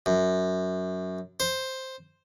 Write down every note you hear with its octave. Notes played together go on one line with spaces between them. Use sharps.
F#2
C5